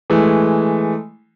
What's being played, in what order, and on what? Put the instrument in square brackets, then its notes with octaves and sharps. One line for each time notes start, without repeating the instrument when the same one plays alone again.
[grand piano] E3 G#3 A3